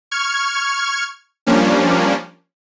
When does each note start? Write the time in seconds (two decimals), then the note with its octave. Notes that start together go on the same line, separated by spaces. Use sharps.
0.11 C#6 F6 G#6
1.47 F3 G3 A#3 C#4 D4